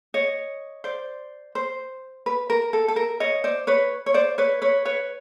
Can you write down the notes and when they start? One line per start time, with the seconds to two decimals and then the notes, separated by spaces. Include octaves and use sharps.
0.14 C#5 D#5
0.84 C5 D5
1.55 C5
2.26 B4
2.50 A#4
2.73 A4
2.88 A4
2.96 A#4
3.20 C#5 D#5
3.44 C5 D5
3.67 B4 C#5
4.06 C#5
4.14 C5 D5
4.38 B4 C#5
4.62 B4 C#5
4.85 B4 C#5